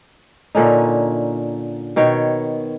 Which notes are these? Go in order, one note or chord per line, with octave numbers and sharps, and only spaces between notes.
A#2 D3 C#4 D#4
B2 D#3 C#5 G5